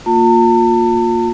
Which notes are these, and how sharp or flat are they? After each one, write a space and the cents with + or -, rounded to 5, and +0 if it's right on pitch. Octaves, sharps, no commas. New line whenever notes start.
A#3 +0 F4 +25 A5 +40